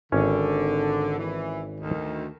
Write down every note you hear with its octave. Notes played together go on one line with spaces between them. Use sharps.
G#1 D3 C#4 C#5
E3
D2 D#3